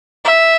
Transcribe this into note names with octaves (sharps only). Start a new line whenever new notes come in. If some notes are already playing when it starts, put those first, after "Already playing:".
E5